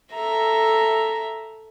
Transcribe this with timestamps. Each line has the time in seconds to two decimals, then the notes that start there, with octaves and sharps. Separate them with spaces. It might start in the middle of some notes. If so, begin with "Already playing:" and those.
0.13 A4 E5 A#5